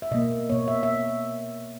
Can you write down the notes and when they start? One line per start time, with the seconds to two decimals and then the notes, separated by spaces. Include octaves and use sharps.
0.02 E5
0.11 B2 A#3 D#5
0.49 B2 A#3 C#5
0.68 E5
0.83 E5